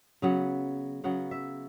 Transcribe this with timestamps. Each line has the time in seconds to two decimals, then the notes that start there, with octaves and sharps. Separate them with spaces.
0.22 C#3 F#3 B3 F#5
1.04 C#3 F#3 B3 F#5
1.31 E5